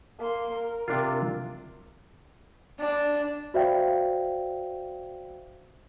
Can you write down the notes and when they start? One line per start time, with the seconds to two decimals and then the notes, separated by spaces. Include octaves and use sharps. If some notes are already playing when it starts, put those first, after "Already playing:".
0.19 A#3 C6
0.52 A#4
0.88 C3 D4 F4
2.80 D4
3.54 F#4 C5 D5 E5 F5 G5